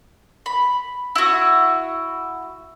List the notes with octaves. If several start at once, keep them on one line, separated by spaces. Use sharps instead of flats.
B5
E4 F#4